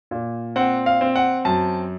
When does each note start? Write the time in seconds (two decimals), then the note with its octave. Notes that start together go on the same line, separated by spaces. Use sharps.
0.11 A#2
0.56 C4 F#5
0.86 F5
1.01 C4
1.15 F#5
1.45 F#2 A5